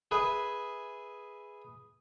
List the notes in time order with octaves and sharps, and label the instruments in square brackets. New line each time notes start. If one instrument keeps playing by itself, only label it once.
[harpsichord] G#4 B4 E5